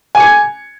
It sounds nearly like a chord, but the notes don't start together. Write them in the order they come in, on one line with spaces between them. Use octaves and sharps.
G#5 D6 C#7 G#6